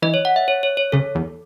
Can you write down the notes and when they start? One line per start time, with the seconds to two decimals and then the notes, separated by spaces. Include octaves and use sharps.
0.02 E3 D#5
0.14 C#5
0.25 F#5
0.36 E5
0.48 C#5
0.63 C#5
0.77 C#5
0.92 C#3 A4
1.15 E2